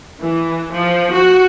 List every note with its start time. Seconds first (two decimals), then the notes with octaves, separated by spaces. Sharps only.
0.20 E3
0.71 F3
1.12 F#4